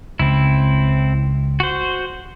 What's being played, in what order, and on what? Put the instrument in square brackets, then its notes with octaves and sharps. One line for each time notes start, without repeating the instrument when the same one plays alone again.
[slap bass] C#2 [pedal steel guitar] C4 E4
[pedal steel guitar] F#4 C5